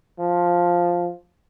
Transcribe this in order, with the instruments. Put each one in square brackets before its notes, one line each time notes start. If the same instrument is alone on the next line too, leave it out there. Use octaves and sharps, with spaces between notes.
[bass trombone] F3